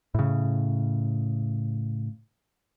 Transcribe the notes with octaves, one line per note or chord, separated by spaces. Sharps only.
A2 C#3